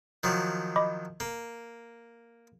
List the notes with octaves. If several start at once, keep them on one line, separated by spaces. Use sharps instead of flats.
D#3 F3 F#3
D#5 B5 D6
A#3